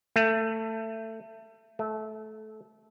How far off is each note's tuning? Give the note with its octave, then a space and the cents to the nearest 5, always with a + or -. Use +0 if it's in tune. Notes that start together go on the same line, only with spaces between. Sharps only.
A3 +20
A3 -20